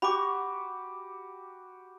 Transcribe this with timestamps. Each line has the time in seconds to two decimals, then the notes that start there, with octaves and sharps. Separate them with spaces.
0.02 F#4 G4 B5 D6